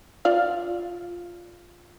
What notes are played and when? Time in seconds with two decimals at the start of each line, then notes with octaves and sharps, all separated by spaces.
0.25 F4 D5 F5